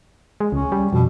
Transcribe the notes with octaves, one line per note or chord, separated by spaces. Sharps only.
G#3
C#2 C#4
G3
F2 B2